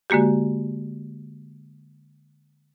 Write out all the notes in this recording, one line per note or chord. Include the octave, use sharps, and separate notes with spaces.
D3 G#3 A#3 F#4 G4